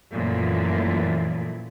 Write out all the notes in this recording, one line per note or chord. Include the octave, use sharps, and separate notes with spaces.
F#2 A#2 E3 F3 A3 E4